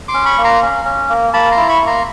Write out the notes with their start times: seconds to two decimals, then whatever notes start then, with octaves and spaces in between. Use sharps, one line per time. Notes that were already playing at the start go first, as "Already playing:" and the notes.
0.08 C6 D6
0.14 C#4
0.25 B5 C#6
0.38 A#3
0.44 A#5 C6
0.62 C#4
0.85 C#4
1.09 A#3
1.33 A#3 A5 B5
1.51 A#5 C6
1.57 E4
1.68 B5 C#6
1.81 A#3
1.87 A#5 C6